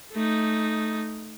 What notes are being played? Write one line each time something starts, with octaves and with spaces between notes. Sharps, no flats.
A3 D#4